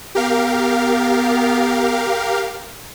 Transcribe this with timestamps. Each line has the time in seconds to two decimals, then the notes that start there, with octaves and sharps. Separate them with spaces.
0.15 B3 G4 A#4 F5